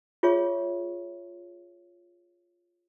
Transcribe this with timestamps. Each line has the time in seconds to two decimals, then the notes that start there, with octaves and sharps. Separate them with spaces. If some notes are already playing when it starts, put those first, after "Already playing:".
0.23 F4 G#4 C#5 E5 C#6